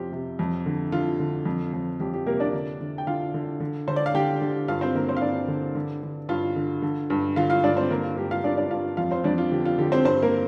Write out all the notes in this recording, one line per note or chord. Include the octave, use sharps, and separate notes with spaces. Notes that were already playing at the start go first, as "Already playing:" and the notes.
Already playing: F2 C3 C4 F4 G4
C3
F2
D3
D3 F4
D3
F2
F2
F2 G4
G4
C3 A#3 A#4
D4 D5
D3
D3
G5
D3 F4 F5
D3
D3
D3 C5
D5
F5
D3 G4 G5
D3
G2 F4 F5
C4 C5
D3 A#3 A#4
C4 C5
F5
G2 D4 D5
D3
D3
D3
G2 F4 F5
D3
D3
G2
D3 F4 F5
F4 F5
G2 D4 D5
C4 C5
D3 A#3 A#4
F4
G2 G4
F4 F5
G2 D4 D5
D4 D5
G2 F4 F5
F2 F4 F5
C4 C5
F2 D4 D5
F4
D3 G4
F4
D3 G4
C4 C5
G2 C4 C5
A#3 A#4